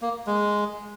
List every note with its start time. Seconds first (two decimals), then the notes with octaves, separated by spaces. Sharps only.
0.02 A#3
0.27 G#3